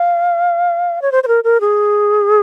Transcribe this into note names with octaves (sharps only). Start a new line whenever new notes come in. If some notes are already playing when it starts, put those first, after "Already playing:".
Already playing: F5
C#5
C5
C5
A#4
A#4
G#4